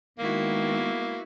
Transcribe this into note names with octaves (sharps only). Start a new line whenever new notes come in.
D#3 G#3 A#3 B3 E4 F#4